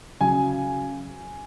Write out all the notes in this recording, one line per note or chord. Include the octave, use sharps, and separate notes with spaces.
C#3 F#3 G#5